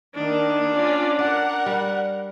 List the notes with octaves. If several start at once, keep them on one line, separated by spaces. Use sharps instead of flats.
D#3 A#3 D4
C#4 F4 D5
A#4 D5 F#5
G3